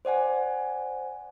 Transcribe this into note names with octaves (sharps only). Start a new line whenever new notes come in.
C5 D5 F#5 G#5